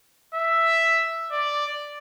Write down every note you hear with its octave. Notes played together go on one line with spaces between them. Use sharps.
E5
D5